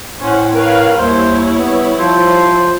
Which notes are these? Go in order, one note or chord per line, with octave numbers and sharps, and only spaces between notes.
A2 C#4 C5 F#5
A#4 B4 C#5 F5
D#2 G3 E4 C5 C#5
B3
F3 C5